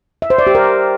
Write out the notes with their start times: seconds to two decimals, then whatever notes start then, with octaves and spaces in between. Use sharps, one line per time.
0.22 E5
0.30 C5
0.38 D5
0.47 G4
0.55 A#4